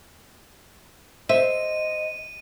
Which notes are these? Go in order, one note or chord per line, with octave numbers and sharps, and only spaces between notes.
C5 D#5 E5 D#7